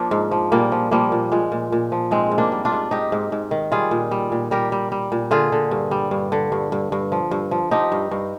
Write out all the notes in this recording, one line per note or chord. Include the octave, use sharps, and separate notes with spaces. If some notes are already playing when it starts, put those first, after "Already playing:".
Already playing: F3 A#3 D4
G#2
F3
A#2 G3 A#3
F3
F3 G3 A#3
A#2
A#2 G#3
A#2
A#2
F3
G#2 G#3 C4
G#2
A#3 D4
G3
D4 F4
G#2
G#2 D#4 G4
G#2
G#2
D#3
G3 F4 G#4
A#2
G3
A#2
G3 G4 A#4
G3
G3
A#2
D3 F4 G#4
D3
G2
G3
G2
D3
G2
G2
G2
F3
G2
F3
F3 D#4 G4
G2
G2